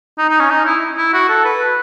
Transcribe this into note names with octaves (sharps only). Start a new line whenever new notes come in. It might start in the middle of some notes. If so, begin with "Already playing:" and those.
D#4
D#4
C#4
D#4
E4
E4
F#4
A4
B4